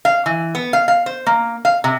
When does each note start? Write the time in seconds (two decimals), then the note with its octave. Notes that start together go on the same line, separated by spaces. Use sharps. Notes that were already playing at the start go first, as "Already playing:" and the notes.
0.05 F5
0.26 E3
0.55 B3
0.73 F5
0.88 F5
1.06 C5
1.27 A#3
1.65 F5
1.84 C3